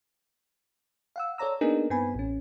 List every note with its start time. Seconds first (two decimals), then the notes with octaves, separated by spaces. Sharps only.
1.16 F5 F#5 E6
1.38 A4 C#5 D5 A#5 E6
1.61 A#3 B3 D4 D#4 G#4 A#4
1.90 G2 B3 C4 G#5 B5
2.15 A1 C#4